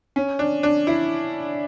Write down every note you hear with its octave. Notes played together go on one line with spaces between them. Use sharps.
C#4
D4
D4
E4